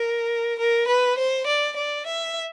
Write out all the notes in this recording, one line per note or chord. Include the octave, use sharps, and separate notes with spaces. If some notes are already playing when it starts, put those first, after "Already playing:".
Already playing: A#4
A#4
B4
C5
D5
D5
E5